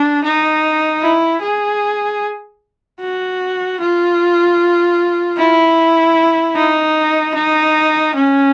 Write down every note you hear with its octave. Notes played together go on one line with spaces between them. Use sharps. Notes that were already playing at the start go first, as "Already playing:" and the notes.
Already playing: D4
D#4
E4
G#4
F#4
F4
E4
D#4
D#4
C#4